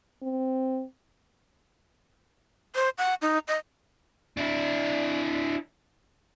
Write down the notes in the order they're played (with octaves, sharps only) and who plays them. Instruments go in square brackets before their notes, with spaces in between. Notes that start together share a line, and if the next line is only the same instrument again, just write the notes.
[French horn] C4
[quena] C5
F#5
D#4
D#5
[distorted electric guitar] D4 E4